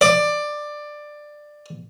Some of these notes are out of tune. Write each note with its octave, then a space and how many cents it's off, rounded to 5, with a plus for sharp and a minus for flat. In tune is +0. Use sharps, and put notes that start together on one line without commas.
D5 +15